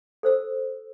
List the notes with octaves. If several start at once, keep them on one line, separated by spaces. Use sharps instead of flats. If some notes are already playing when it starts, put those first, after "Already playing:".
A4 C5 E6